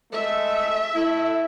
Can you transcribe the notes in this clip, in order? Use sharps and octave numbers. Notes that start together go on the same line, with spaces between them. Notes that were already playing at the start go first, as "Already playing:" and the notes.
G#3 A3 E5
A3 E4